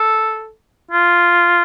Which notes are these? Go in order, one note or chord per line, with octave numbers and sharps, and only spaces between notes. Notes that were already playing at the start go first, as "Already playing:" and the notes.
Already playing: A4
F4